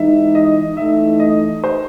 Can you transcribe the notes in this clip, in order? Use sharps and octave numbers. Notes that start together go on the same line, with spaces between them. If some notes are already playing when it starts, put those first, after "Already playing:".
Already playing: E3 G#3 D#4 E5
D#5
E3 A3 D#4 E5
D#5
C5